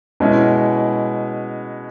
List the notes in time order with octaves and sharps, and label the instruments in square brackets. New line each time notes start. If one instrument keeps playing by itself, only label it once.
[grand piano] B2 G#3 C#4 E4